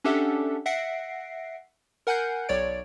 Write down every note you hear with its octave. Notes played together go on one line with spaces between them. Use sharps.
C#4 D4 G4 A4 E5 F#5
E5 F#5 A#6 C7 D7
A#4 F#5 G#5 F#6 G6 C7
B1 C#5 D5 D7